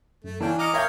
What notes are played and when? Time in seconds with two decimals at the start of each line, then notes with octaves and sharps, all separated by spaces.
0.24 F#2 A3
0.40 E3 C#4 D4 F5 G5 A5
0.59 D#5 A#5 D6 D#6 F6 C#7
0.74 A#4 C#5 E5 F5 G5 G6